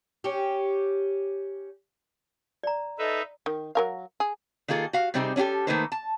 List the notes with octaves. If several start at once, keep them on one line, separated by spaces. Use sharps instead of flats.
C#4 G4
D5 A#5
D#4 A4 B4 D#5 E5
D#3
F#3 A#4 F5
G#4
D#3 A#3 F4 G#4 A4
F#4 F5
C3 G3 C4 D#4 F#4 G#4
C#4 D4 F4 G4 A4
D#3 A3 A#3 D#4 B4 C5
A5